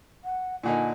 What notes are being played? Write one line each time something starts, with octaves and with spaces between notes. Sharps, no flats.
F#5
A#2 D3 D#4 G#5